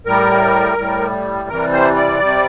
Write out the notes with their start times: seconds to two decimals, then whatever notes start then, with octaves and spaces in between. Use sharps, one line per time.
0.06 A2 G3 A#4
0.78 A2 G3
1.49 C3 E3 G3 A#4
1.73 C5
1.96 D5
2.20 C3 G3